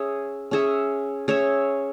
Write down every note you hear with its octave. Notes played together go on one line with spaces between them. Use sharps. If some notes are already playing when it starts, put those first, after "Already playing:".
Already playing: C#4 G#4 C#5 E5
C#4 G#4 C#5 E5
C#4 G#4 C#5 E5